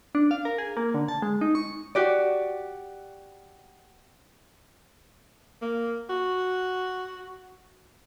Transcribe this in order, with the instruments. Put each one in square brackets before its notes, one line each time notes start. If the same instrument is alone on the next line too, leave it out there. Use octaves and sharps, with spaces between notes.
[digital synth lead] D4
F5
A#4
G#4
A#3
D3
A5
G#3
D#4
C#6
[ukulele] F#4 G4 D5
[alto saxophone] A#3
F#4